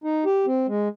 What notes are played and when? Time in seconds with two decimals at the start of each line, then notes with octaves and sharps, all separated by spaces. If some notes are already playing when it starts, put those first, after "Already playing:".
0.04 D#4
0.25 G4
0.46 C4
0.68 G#3